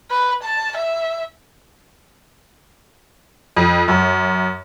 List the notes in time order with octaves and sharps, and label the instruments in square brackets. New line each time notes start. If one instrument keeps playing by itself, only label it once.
[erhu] B4
A5
E5
[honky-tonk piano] F2
F#2